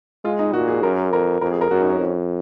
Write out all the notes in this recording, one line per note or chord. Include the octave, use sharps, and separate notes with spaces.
G#3 F4
D#4
A#2 F#4
G#4
F#2 A#4
F2 A#4
F2 A#4
G#4
A#4
F#2 F#4
D#4
C#4
F2